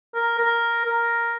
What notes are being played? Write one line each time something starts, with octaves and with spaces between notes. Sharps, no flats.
A#4
A#4
A#4